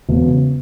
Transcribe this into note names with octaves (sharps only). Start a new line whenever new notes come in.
E1
C#3